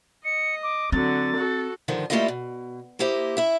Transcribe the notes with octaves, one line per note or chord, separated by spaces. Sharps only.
D#5 C#7
D6
D3 F#3 C4 A6
F#4 A4
G2 D3 D#3 F3
G3 A3 A#3 E4 F4 D#5
B2
A#3 E4 G4 C5 D#5
E4 E5